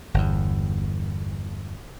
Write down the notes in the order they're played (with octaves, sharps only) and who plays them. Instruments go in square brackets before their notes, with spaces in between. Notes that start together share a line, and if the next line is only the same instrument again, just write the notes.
[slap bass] G1 E2